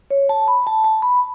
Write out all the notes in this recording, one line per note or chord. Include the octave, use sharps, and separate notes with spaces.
C#5
A5
B5
A5
A5
B5